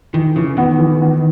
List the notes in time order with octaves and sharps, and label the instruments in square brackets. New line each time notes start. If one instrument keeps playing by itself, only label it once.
[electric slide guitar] D#3 [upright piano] E3
[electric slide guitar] C#3 [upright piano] E3
[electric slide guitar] D#3 [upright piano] B3
[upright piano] E3
B3